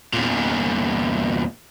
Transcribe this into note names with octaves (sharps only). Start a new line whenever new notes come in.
E2 A#2